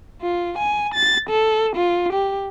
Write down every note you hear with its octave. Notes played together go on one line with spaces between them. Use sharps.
F4
G#5
A6
A4
F4
G4